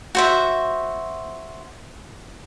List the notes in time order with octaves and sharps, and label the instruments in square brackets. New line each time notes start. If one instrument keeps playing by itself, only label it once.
[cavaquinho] F#4 C5 E5